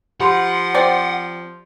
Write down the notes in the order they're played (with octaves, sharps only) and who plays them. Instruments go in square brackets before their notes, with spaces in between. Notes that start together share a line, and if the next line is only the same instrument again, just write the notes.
[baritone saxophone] F3 [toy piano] G4 B5 C6 [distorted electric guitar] F#5
[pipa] C4 D5